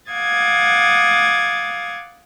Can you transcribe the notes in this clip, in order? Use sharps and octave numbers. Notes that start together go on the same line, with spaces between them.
F5 F#5 D6 D#6 G#6 A6